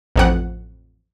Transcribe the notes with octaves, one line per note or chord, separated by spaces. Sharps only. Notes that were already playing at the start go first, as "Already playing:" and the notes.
A1 F2 F#5